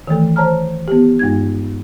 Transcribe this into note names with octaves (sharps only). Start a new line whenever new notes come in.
D#3 E3 A3 A4
C5 C#5 A5 A#5 F6
B3 G4
G2 G#3 D#4 G#6